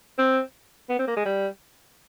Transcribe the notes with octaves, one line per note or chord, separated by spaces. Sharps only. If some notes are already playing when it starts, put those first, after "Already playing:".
C4
B3
C4
A#3
G#3
G3